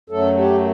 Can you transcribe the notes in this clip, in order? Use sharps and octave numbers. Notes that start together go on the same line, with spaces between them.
F#2 F#3 A3 A4
G4